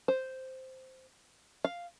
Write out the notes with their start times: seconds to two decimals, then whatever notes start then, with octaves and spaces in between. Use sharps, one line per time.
0.08 C5
1.65 F5